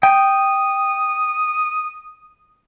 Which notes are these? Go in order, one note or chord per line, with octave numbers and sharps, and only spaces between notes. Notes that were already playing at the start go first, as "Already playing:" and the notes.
G5 D#6